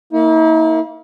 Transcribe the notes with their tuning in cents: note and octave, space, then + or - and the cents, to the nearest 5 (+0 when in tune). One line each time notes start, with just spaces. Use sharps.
A#3 -15 E4 -45